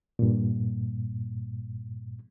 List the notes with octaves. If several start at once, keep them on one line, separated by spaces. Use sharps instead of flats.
G2 A#2